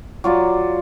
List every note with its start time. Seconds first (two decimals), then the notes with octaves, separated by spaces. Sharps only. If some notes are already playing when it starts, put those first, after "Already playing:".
0.24 F#3 F4 D5